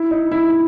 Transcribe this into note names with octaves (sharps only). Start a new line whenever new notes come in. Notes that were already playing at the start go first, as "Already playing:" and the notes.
Already playing: E4
D#4
E4
E4